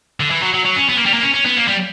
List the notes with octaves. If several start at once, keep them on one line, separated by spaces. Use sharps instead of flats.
D3
E3
F#3
F#3
F#3
C#4
B3
A#3
G3
A#3
C#4
C#4
B3
A#3
G3